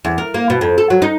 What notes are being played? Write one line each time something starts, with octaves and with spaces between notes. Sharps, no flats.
E2
A#4
A#3
B2
F2
A4
F#3
D#4